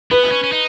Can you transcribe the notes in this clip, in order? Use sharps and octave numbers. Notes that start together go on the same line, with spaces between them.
B3 B4
C#4
C#4
D#4